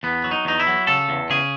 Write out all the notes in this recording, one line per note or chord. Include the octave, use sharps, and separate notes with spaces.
E2 B3
F#3
D#4
E2 D#4
E4
F#3
C#3 A4
E2
C#3 G#4